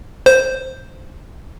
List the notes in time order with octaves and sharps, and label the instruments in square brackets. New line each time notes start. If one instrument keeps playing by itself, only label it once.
[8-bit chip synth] C5